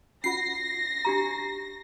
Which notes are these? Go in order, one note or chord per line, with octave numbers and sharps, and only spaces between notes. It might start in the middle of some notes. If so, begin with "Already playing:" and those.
C#4 F4 F#5 A#6 C7
D4 G4 A#5